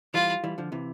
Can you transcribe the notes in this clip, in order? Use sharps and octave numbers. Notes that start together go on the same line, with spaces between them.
E3 G3 F4
E3 G3
D3 F3
C3 E3